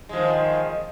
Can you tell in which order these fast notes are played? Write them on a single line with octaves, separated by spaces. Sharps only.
G#3 F3 D#3